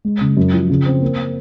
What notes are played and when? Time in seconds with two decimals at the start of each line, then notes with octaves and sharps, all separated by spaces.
0.05 G#3
0.21 C#3
0.37 F#2
0.54 F3
0.70 C#3
0.86 C4
1.02 A#3